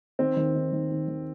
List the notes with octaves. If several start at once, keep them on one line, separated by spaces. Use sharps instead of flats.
D#3 C4
D#2
D#3
D#2
D#3
D#2